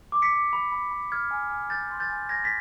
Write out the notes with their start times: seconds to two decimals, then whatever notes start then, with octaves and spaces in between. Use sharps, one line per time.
0.12 D6
0.22 B6 C#7
0.33 D6
0.53 B5
0.72 B5
0.91 B5
1.12 F6 G#6
1.31 G#5
1.50 G#5
1.70 G#5 G6 A6
1.91 C6
2.00 G6 A6
2.10 G#5
2.29 G#5 G#6 A#6
2.44 A6 B6